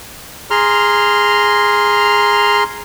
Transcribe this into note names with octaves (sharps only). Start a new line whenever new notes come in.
G#4 A#5 C6 F6